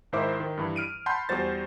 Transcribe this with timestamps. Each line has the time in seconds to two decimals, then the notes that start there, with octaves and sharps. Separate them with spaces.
0.13 G#2 D#3 E4 C5 E5 D6
0.40 D#3
0.57 G2 E3
0.76 F6 D7 D#7
1.06 F#5 A5 B5 C6 F6 G6
1.29 E2 G3 F#4 C5 A6